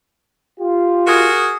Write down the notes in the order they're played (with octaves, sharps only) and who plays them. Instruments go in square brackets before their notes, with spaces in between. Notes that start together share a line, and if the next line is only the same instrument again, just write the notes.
[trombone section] F4 G4
[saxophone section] F#4 G#4 A#4